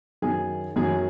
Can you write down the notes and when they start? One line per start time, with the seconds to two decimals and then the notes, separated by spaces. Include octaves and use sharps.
0.22 F#2 D#3 F#3 G#4
0.76 F#2 D#3 F#3 G#4